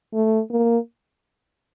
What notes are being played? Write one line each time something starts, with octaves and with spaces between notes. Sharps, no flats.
A3
A#3